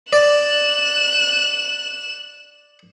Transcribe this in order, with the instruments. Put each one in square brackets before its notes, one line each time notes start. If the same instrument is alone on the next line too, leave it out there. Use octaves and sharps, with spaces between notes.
[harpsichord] D5 [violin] F#6 E7